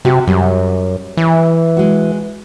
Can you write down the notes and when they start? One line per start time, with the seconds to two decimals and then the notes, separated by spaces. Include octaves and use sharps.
0.05 C3 F#4 G4
0.27 F#2 G3
1.17 E3
1.77 G#3 F#4